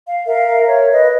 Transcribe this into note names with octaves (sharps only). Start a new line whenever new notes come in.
F5
A#4 E5 F5
C#5
B4 D#5